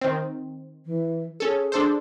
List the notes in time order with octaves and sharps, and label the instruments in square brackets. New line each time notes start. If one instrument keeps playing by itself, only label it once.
[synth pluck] D#3 C4
[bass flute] E3
[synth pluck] C#4 A4 [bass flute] G#4
[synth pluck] D4 A4 C5